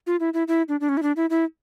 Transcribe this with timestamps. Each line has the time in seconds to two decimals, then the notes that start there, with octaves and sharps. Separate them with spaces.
0.07 F4
0.20 E4
0.34 E4
0.48 E4
0.69 D4
0.80 D4
0.89 C#4
0.97 E4
1.03 D4
1.16 E4
1.30 E4